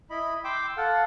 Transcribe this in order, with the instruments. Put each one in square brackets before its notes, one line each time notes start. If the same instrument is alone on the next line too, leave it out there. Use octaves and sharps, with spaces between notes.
[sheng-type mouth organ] E4 D#5 B5
G5 C6 D6 E6
A4 F5 F#5